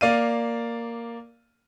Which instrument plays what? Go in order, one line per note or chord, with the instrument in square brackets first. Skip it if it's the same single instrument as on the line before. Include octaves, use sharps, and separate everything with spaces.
[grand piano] A#3 D5 F5 D#7